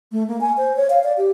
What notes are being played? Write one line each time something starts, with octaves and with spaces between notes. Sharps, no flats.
A3
A#3
G#5
C5
C#5
F5
D5
G4